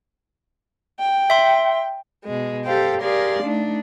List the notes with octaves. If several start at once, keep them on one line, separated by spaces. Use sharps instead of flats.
G5
E5 C6
B2 G#3
G4 A4 C5 F5 G5
G4 G#4 A#4 D5 F5 C6
A3 D4 D#4